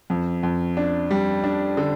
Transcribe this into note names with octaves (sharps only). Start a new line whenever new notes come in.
F2
F2
D4
G3
D4
D3